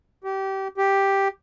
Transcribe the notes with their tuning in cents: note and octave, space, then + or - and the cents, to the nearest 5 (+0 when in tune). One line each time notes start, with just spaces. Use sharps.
G4 -25
G4 +0